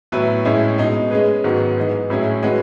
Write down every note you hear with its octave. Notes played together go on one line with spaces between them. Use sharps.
A2 F#3 B3 E4 B4
A2 G#3 C#4 E4
B2 G#3 D#4
G#3 C#4 G#4 B4
G#2 D#3 F#3 B3 F#4
E3 G#3 D#4
A2 F#3 C#4 E4 G#4
G#3 C#4 F#4 B4